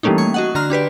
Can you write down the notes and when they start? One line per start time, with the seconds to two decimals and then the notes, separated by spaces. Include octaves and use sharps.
0.03 E3 G3 A3 A#3 C#4 D#4
0.18 C#6 G#6
0.34 F#4 D#5 F#5
0.55 D3 F#4 A#5 C6 F6
0.70 D4 G4 B4 D5